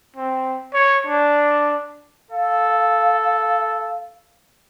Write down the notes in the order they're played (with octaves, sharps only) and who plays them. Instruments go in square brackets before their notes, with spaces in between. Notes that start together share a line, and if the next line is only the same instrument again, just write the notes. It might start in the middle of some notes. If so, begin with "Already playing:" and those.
[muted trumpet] C4
C#5
D4
[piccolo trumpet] A4 [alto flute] F5